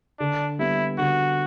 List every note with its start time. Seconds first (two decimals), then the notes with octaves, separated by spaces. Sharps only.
0.20 D3 D4
0.59 G3 B3 E4
0.99 D3 F#4